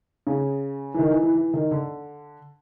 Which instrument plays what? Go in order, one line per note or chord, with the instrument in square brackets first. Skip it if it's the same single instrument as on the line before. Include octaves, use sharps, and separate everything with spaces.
[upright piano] C#3
E3
D#3
E3
E3
E3
D#3
D3